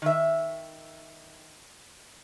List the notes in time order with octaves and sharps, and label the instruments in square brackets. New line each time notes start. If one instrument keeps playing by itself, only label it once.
[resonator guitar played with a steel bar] D#3 E5